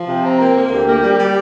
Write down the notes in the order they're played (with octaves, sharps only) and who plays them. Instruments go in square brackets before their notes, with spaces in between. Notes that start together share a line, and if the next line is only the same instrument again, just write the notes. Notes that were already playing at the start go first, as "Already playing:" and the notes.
Already playing: [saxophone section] F3
[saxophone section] C3 [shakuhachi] G5
[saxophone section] C4 [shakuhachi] A#5
[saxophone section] A#3 [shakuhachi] G5
[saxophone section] A#3
[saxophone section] D2 [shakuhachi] G4
[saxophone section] A#3
G3
G3